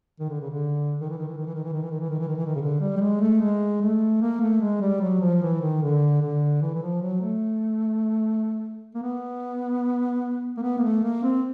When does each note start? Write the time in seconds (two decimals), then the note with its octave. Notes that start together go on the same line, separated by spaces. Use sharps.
0.20 D#3
0.30 D3
0.40 C#3
0.50 D3
1.01 D#3
1.09 E3
1.18 D#3
1.28 E3
1.37 D#3
1.46 E3
1.55 D#3
1.64 E3
1.73 D#3
1.83 E3
1.91 D#3
2.01 E3
2.10 D#3
2.19 E3
2.28 D#3
2.37 E3
2.46 D#3
2.56 C#3
2.61 D3
2.81 G3
2.97 G3
3.00 G#3
3.21 A3
3.41 G#3
3.82 A3
4.21 A#3
4.41 A3
4.61 G#3
4.81 G3
5.01 F#3
5.21 F3
5.42 E3
5.61 D#3
5.82 D3
6.22 D3
6.62 E3
6.75 E3
6.82 F3
7.02 F#3
7.21 A3
8.94 A#3
9.03 B3
10.57 A#3
10.62 B3
10.78 A#3
10.84 A3
11.04 A#3
11.23 C4